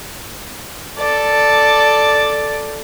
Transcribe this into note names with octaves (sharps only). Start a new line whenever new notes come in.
A4 D5